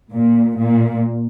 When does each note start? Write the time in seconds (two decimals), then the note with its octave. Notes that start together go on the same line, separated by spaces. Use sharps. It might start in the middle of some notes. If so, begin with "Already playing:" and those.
0.13 A#2
0.57 A#2